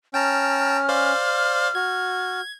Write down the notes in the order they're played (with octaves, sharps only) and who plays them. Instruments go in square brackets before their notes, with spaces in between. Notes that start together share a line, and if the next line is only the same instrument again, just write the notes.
[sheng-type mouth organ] C#4 [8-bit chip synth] G5 A5 A#5 [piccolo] F6
[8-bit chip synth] C5 D5 F5
[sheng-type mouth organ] F#4 [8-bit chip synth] G#6